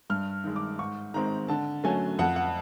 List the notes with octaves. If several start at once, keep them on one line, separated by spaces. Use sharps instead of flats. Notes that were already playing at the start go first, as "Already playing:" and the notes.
G2 F6
D#3 G#3
D6
G#2 C#6
D#3 G#3 C4 A#5
D3 A5
F#3 A3 C#4 G#5
F2 F#5
F#5